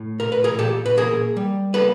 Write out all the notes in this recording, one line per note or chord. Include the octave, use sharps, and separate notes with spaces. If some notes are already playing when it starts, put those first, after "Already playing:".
Already playing: A2
A#2 A#4
B4
G#4 A#4
A#2 G4 A4
B4
A#3 G#4 A#4
G3
A#3 A4 B4